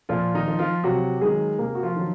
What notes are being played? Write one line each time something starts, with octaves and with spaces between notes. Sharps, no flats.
A#2 F3 F4
D#3 D#4
F3
F3 F4
C3 F#3 F#4
D#3 F#3 G#3 G#4
C3 A#3 A#4
F#4
F3 F4
D#3 F#3